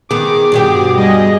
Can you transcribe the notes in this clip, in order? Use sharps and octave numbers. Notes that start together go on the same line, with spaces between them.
D#3 B3 G#4 D6
G2 B2 F#4 G4
G3 G#4 D#5